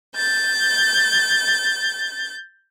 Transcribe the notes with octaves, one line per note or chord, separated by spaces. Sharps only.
G6 A6